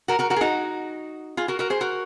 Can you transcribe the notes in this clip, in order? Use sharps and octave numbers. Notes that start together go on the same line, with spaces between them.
F#4 A#4
F#4 A#4
F#4 A#4
G#4
D#4 F#4
F4 G#4
F#4 A#4
F#4 A#4
G#4 C5
F#4 A#4